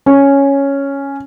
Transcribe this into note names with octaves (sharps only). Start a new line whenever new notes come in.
C#4